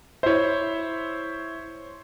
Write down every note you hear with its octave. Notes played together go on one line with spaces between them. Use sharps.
E4 C5 C#5 E5